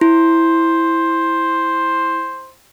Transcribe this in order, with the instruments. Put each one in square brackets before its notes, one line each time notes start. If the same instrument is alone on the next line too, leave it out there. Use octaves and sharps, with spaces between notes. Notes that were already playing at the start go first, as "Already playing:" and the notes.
[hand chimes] E4 [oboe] C5